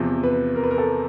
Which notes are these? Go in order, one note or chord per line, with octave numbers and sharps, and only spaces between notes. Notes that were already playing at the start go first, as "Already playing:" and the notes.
Already playing: E2 C3 F3
B4
A#4
B4
A#4
A4